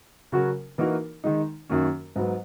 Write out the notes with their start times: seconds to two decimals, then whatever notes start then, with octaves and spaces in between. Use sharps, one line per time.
0.32 C#3 F#3 C#4 F#4 A#4
0.78 E3 A#3 D#4 F#4 A#4
1.24 D#3 G#3 D#4
1.69 F#2 D#3 A#3 C#4
2.16 G#2 F#3 B3